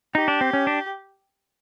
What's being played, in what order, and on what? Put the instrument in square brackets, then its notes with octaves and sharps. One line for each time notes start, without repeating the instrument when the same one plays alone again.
[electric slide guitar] D#4 [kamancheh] G4
[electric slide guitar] D4
C4
C#4
D4